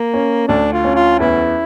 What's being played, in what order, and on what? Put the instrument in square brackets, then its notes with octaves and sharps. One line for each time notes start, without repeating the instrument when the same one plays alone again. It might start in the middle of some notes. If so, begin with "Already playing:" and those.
Already playing: [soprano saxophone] A#3
[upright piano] C#4
[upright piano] D2 [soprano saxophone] D4
[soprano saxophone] F4
[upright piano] C#4
[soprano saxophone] F4
[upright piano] E2 [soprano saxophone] E4